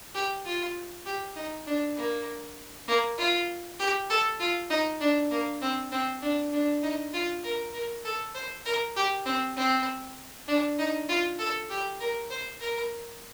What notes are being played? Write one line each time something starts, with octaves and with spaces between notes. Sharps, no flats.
G4
F4
G4
D#4
D4
A#3
A#3
F4
G4
A4
F4
D#4
D4
A#3
C4
C4
D4
D4
D#4
F4
A#4
A#4
A4
C5
A#4
G4
C4
C4
D4
D#4
F4
A4
G4
A#4
C5
A#4